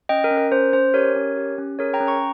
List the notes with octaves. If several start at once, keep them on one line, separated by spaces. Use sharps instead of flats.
C#4 D#5 G5
A#4
C#4
A#4
C#4 C5
C#4 C5
G4 A#4 C#5
C#4
G4
C#4
G#4 A#4 C#5
G5 A#5
C#4
A#5 C#6